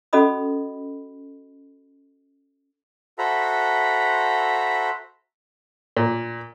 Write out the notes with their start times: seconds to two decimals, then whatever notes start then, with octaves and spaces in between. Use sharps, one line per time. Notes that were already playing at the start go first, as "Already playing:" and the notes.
0.13 C#4 F#4 A4 D#5 B5 D#6
3.18 F#4 A4 C5 E5 A#5 B5
5.97 A#2